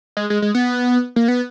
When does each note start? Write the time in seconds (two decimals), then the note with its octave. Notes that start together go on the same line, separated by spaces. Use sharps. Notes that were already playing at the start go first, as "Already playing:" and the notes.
0.17 G#3
0.30 G#3
0.42 G#3
0.55 B3
1.16 A#3
1.28 B3